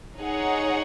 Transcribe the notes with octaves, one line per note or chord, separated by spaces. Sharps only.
D#4 G#4 C#5 F#5